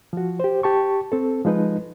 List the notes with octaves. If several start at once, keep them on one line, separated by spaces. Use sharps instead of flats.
F3 F#4
G4 C5
G4 A5 C#6
C4 A4
F3 G#3 D#4 B4